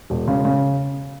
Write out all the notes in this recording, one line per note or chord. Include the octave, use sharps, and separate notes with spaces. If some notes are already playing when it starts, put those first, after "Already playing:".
E1
C#3
C#3